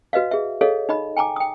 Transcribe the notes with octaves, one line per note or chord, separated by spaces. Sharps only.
F#4 B4 D#5 F5
G#4 E5
G#4 A4 C#5 D#5 F5
D#4 D#5 B5
G5 G#5 A#5 D6
G5 D#6